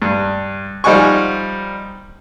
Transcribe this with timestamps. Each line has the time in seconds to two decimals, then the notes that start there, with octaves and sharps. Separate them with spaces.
0.02 G2
0.84 F3 G3 D#4 F#5 G#5 C#6